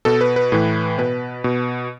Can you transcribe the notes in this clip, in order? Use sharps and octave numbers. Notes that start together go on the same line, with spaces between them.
B2 A4
B4
B4
A2 E3
B2 B4
B2